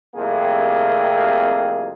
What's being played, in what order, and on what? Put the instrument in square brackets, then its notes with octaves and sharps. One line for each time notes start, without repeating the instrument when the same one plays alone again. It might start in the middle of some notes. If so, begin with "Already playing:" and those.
[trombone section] C2 F2 C3 A3 A#3 G#4